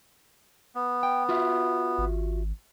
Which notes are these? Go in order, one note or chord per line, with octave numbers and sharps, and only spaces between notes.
B3
G5
F4 F#4 E5
G#1